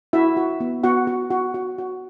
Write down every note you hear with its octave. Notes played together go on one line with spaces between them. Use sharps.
E4 F#4 E5
F#4
B3
B3 F#4 F#5
F#4
F#4
F#4
F#4